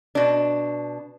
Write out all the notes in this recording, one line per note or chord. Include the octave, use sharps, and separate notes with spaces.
B2 D4